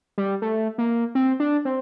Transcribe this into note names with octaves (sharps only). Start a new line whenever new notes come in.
G3
A3
A#3
C4
D4
C4